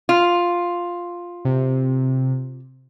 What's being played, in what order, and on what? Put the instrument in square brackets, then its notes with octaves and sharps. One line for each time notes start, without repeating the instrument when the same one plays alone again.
[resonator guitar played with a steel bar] F4
[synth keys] C3